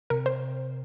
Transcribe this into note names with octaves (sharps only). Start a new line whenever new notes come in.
C3 A#4
C5